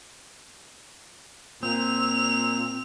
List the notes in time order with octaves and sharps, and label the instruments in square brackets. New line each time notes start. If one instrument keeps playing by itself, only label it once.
[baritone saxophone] A#2 [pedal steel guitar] C4 [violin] F7